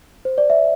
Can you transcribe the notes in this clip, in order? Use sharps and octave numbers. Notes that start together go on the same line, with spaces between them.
C5
D5
E5